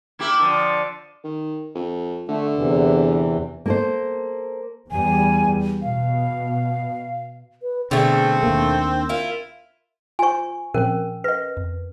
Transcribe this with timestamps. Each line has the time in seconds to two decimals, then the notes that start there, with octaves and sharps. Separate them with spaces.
0.19 A#3 E4 G4
0.40 D3 F3
1.24 D#3
1.75 F2
2.29 D3 A3
2.57 E2 C3 E3
3.66 A#3 A4 C5
4.91 E2 G3 G#5
5.82 B2 F5
7.62 B4
7.91 B2 D3 A3 C4 G#4
8.43 D#2 A#3 D4
9.09 E4 F4 A#4
10.19 F4 C5 G#5 C#6
10.74 A#2 F3 C4 C#4 A#4
11.24 B4 D#5 A#6
11.57 F2